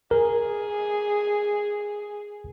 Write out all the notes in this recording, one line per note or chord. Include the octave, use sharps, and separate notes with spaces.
G#4 A#4